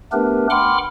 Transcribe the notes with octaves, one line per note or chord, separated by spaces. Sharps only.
A3 B3 D4 G4 A#4 B4
F#5 G5 B5 C6 D6 F6